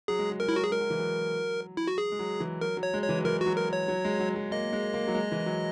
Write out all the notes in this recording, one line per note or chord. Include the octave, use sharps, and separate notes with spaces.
F#3 G#4
G#3
F#3
G#3 A#4
E4
F#3 F#4
G#4
G#3 A#4
F#3
E3
F#3
E4
F#4
G#4
G#3
F#3
E3
F#3 A#4
F#3
C#5
G#3
E3 C#5
F#3
E3 A#4
F#4
F#3
A#4
C#5
F#3
G#3
F#3
F#3
A#3 D#5
G#3
A#3
F#3
G#3
E3
F#3